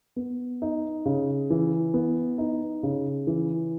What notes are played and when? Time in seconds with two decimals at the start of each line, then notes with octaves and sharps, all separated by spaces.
0.16 B3
0.62 D#4
1.06 C#3
1.50 E3
1.94 B3
2.38 D#4
2.83 C#3
3.27 E3